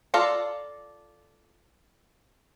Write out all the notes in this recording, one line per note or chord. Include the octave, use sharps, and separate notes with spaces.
F4 A4 D5 F5 A#5